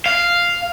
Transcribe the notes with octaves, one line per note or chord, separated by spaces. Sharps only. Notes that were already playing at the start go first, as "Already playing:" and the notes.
F5